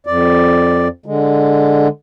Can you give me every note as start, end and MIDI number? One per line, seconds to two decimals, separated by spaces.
0.07 0.88 41
0.07 0.88 74
1.06 1.88 50
1.06 1.88 56